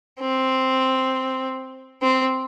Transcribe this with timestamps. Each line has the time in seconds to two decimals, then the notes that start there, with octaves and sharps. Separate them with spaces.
0.19 C4
2.01 C4